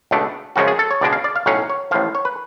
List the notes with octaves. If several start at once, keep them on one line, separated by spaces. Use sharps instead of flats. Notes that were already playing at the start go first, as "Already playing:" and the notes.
C#2 B2 A3 D4
F#2 C#3 F3 G#3 C#4 F#4
G#4
A4
C#5
C#2 B2 G#3 D4 D5
F5
D5
F5
B1 A2 F#3 C#4 F5
C#5
A1 A2 F3 F5
C#5
B4